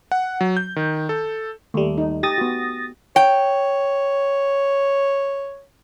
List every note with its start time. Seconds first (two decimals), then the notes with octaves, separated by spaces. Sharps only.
0.12 F#5
0.41 F#3
0.57 G6
0.76 D#3
1.09 A4
1.74 D#2 G3 A3
1.98 D#4
2.23 G4 D#6 A6 A#6
2.38 B3 F#4
3.16 C#5 G5